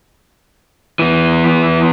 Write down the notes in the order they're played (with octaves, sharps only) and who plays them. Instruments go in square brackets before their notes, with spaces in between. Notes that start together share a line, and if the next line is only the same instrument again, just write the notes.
[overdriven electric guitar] E3 B3